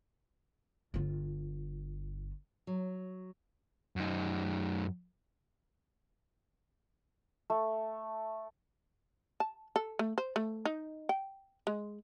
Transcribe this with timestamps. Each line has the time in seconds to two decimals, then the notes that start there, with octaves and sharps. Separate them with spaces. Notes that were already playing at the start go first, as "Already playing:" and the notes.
0.94 G1 F4
2.67 F#3
3.96 F#2 D#4
7.50 A3
9.40 A5
9.76 A4
9.99 A3
10.18 C5
10.36 A3
10.65 D#4
11.09 G5
11.67 G#3